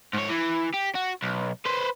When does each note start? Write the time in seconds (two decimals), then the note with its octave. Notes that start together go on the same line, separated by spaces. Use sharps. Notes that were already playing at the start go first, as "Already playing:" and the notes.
0.13 G#2 C#5
0.29 E3
0.74 G4
0.95 F#4
1.23 B1
1.66 B4 C5